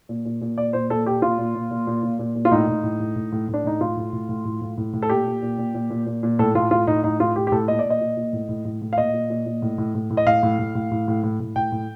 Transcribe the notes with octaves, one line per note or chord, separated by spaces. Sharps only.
A#2
A#2
A#2
A#2 D5
A#2 C5
A#2 A4
A#2 G4
A#2 F4
A#2
A#2
A#2
A#2
A#2
A#2
A#2
F4
A2 D#4
A2
A2
A2
A2
A2
A2
D4
A2 D#4
A2 F4
A2
A2
A2
A2
A2
A2
A2
A4
A#2 G4
A#2
A#2
A#2
A#2
A#2
A#2
A#2
A2 A4
A2 F4
A2 F4
A2 D#4
A2 D#4
A2 F4
A2 G4
G4
A2 A4
A#2 D#5
D5
A#2
D#5
A#2
A#2
A2
A2
A2
A2
F5
A#2 D#5
A#2
A#2
A#2
A2
A2
A2
A2
D#5
A2 F5
A2
A2
A2
A2
A2
A2
A2
A2 G5
A2